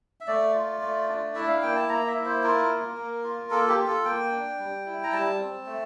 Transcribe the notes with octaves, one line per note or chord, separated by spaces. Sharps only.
E5
A3 D5
F4
A3
D4
E4 E5
F5
A#3 G5
A5
A#3 A#5
E5
E4
C5
F4 A#4
A#3
A#3
F4
A#3 A4
G4
F4
A4
A#3 G5
D4
G3
E4
A#5
G3 A5
C4
A3